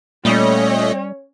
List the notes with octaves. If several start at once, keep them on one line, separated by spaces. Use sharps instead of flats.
A#2 G3 A3 C#4 C#5 D#5